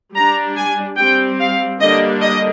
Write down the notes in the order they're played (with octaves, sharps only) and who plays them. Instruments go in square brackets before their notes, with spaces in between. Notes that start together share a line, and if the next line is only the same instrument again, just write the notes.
[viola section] G3 D4 A#5
G#5
G3 C4 G5
F5
D3 G3 A#3 D4 D#5
D#5